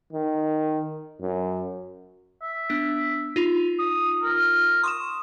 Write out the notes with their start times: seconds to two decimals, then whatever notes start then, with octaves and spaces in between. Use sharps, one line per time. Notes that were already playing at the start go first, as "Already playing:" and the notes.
0.12 D#3
1.21 F#2
2.42 E5
2.69 B3 D4 B6
3.36 D#4 F4
3.79 D#6
4.22 A#4
4.84 C6 C#6 D#6 E7